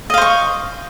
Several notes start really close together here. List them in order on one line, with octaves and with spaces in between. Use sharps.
D#5 F5 C5 C#6